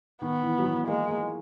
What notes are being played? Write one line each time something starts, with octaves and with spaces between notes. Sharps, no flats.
D#3 B3
E3
F#3
E3
G#3 A#3
A#3